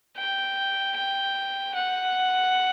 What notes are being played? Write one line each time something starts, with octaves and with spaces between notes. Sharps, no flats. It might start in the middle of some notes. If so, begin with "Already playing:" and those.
G5
G5
F#5